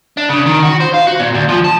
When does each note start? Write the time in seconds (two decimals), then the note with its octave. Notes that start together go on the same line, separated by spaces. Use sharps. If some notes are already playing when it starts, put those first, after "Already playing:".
0.17 D4
0.29 C#3
0.46 D#3
0.63 F#4
0.81 C5
0.94 F5
1.07 F#4
1.20 A#2
1.35 D2
1.49 F3
1.64 A5